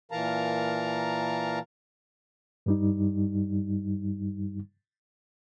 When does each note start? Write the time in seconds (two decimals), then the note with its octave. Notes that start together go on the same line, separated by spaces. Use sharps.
0.12 A#2 E3 A#4 F5 A5 A#5
2.66 G2 G3 D#4